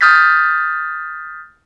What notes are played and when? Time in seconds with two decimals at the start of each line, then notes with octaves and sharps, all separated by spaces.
0.01 D#6 F6 G6 A6 B6